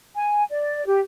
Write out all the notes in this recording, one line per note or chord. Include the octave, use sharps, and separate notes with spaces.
G#5
D5
G4